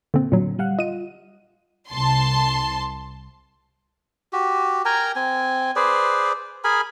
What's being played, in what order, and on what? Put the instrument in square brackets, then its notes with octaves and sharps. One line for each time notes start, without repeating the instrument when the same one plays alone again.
[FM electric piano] A#2 [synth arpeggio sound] D3 C4
[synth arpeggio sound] A#2 F#3 [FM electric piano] D3
[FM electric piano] G3 F5 F#5
[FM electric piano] F4 [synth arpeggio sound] D#5 D#7
[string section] C2 A5 C6
[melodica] F#4 G4
A#4 G5 G#5 A#5
C4 G#5
G#4 B4 C5 D5
G#4 A#4 G#5 B5